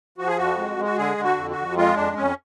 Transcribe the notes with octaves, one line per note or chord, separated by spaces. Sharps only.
F3 F#4
G#4
F2 F#4
G#3
G#3
F#4
D3 G#4
D3
F#4
F2
F#4
F2
G#3 F4
F2 D4
F2 C#4